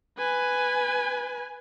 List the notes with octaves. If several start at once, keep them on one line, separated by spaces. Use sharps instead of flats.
B4 G#5